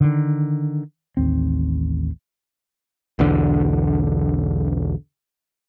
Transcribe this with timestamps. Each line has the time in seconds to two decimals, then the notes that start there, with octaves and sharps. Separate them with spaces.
0.01 D3 D#3
1.17 A1 D#2 C4
3.19 B1 E2 D3